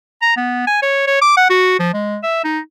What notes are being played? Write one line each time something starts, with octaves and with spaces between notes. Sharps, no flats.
A#5
B3
G#5
C#5
C#5
D6
F#5
F#4
F3
G#3
E5
D#4